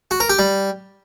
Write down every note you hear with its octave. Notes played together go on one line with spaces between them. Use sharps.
F#4
A#4
G4
G3